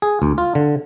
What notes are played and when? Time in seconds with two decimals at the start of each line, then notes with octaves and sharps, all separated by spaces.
0.02 G#4
0.22 D2
0.38 F4
0.55 D3